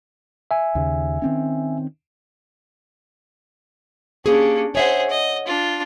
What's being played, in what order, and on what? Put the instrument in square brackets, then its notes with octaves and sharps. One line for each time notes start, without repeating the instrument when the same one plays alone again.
[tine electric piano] E5 G#5
[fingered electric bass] D#2 C#3
D#3 C4 C#4
[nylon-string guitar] A#3 G4 G#4 [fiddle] C#4 D4
[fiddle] G#4 C5 [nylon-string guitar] C#5 E5 F#5
[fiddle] D#5
D4 F4